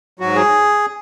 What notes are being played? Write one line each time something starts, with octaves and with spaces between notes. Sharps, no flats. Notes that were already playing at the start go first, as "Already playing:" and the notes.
G#2 F#3 F#4
G#4